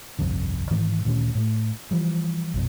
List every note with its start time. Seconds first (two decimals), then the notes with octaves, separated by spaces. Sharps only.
0.19 G1 C2 F2 D3
0.71 G#2 D#3 E3
1.05 D2 A#2 D#3 C#4
1.35 A2 A3
1.91 E3 F3 G3
2.54 A#1 F#2 B2